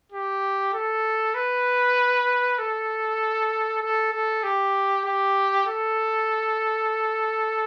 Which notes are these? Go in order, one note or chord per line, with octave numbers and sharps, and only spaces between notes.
G4
A4
B4
A4
A4
A4
G4
G4
A4